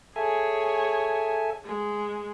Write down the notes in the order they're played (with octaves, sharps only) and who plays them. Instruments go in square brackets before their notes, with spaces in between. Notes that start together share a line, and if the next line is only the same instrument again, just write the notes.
[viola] G#4 C#5 [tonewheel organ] A4 E5 G#5
[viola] G#3